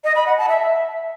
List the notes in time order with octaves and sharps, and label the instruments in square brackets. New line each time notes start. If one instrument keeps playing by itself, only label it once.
[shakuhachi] D#5
B5
F#5
A5
E5